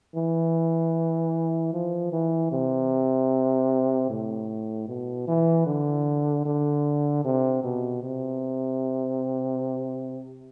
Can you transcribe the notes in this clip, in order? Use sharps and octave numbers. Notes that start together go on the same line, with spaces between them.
E3
F3
E3
C3
A2
B2
E3
D3
D3
C3
B2
C3